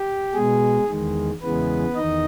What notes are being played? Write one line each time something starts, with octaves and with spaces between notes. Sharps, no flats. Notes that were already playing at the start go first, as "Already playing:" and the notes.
Already playing: G4
B2 G#3 G#4
E2 D#3 G#3
E2 C#3 E3 G#3 B3 B4
E2 D#3 D#4 D#5